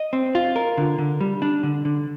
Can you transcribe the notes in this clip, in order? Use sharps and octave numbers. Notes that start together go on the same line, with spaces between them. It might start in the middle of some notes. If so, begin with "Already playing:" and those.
Already playing: D#5
C4
F4
A#4
D3
D3
G3
D4
D3
D3